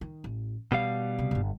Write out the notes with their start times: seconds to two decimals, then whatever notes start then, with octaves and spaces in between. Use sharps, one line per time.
0.01 D#3
0.24 A1
0.72 B2 E3 G3 F5
1.19 C3
1.31 D1 G1